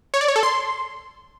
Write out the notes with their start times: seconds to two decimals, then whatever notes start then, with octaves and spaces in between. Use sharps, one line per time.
0.14 C#5
0.21 D5
0.28 C#5
0.36 A4
0.43 C6